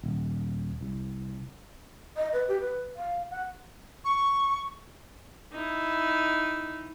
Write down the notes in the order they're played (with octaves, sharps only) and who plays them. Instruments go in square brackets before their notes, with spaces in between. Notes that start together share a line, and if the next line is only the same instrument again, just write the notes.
[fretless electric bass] D#1
C2
[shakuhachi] D#5
B4
G4
B4
F5
F#5
[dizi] C#6
[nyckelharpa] D#4 E4